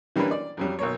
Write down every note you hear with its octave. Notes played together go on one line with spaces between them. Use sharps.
E3 G3 A#3 C#4 D4 B4
D5
F2 F#3 G3
B1 A#3 C#5